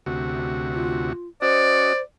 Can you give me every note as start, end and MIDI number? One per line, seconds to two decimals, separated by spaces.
0.06 1.13 38
0.06 1.13 48
0.06 1.13 66
0.74 1.29 65
1.42 1.93 61
1.42 1.93 66
1.42 2.02 72
1.42 2.02 74
1.42 1.93 75